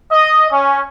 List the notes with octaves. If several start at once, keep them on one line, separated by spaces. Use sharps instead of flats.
D#5
C#4